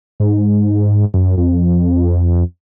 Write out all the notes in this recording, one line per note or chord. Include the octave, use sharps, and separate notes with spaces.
G#2
F#2
F2